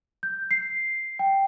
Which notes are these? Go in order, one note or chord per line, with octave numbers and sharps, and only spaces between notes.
G6
C7
G5